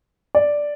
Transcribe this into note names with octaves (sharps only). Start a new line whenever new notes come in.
D5